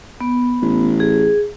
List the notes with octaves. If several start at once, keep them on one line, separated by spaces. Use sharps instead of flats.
B3
A1
G#4